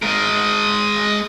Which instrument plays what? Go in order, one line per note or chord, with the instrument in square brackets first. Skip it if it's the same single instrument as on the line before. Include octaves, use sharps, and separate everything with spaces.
[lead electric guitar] G#3 A#4